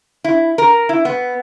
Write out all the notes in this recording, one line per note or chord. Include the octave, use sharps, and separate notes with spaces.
E4
A#4
E4
B3